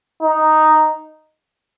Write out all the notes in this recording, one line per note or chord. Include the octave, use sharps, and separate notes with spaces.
D#4